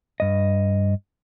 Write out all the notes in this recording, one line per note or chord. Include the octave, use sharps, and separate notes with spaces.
G2 D#5